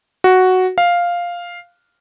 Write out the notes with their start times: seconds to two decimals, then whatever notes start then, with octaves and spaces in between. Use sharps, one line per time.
0.24 F#4
0.78 F5